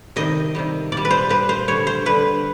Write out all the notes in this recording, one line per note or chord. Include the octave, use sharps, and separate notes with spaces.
C3 D#3 G3 D#5
C3 D#3 G3
A#2 D5
G3
B4
C5
A#2 G3 B4
C5
D3 G3 C#5
C5
D3 G3 B4